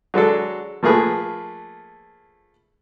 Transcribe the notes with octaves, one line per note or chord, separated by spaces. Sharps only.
F#3 G#3 D4 A4
F3 A3 A#3 G#4 B4